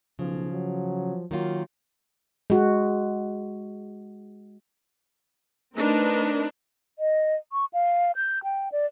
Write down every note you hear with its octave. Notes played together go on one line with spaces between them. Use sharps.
B1 C#3 F3
F#3
D#3 F#3 A#3 F4
G#3 F#4
A3 C4 D4 D#4 A#4 B4
D#5
C#6
F5
G6
G5
D5